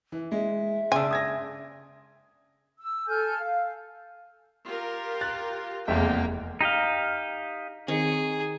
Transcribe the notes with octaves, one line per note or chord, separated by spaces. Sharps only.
E3
G#3 E5
C#3 D4 G#5 C6 E6
D#6 G#6 A#6
E6
A4 G#5 F6 G6
F5
F4 G4 A#4
F#6 A6
F1 E2 G#3 A#3 E5 G5
D#4 G4 D#5 F5
D#3 C4 D#4 G#4 C#5